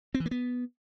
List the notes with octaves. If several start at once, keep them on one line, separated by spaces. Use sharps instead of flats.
C4
E3
A#3
B3